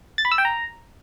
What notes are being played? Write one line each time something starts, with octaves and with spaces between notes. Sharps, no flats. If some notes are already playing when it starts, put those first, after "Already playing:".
A6
B5
E6
G5
A#5